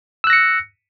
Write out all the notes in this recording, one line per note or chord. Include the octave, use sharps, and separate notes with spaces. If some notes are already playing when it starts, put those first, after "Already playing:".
E6 F#6 A#6 C#7